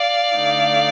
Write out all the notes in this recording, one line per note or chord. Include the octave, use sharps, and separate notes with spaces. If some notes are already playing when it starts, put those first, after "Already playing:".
Already playing: D5 F5
D3 A3 D#4